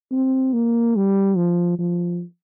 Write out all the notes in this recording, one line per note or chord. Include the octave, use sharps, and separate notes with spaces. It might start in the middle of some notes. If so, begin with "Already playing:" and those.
C4
A#3
G3
F3
F3